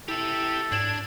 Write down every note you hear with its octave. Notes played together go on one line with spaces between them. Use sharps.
E4 G4 A4 E5
G#2 D4 G#6